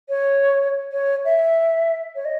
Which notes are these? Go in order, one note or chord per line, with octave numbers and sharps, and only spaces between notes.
C#5
C#5
E5
C#5
D#5